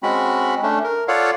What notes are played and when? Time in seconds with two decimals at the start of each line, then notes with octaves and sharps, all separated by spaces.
0.03 G#3 C4 C#4 F#4 B5
0.63 A3 C#4 D4
0.84 A#4
1.08 F4 A4 C#5 D5 F5 F#5